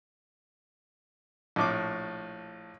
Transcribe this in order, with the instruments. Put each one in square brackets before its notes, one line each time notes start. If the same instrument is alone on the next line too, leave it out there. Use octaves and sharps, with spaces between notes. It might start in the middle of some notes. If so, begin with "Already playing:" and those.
[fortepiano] A#1 A2 D6